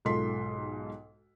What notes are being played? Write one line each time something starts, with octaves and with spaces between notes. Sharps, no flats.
B1 G#2 F4 A4 C6 B6